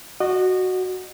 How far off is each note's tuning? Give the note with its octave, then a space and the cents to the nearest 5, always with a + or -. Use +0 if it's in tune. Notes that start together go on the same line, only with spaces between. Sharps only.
F#4 +0 D#5 -35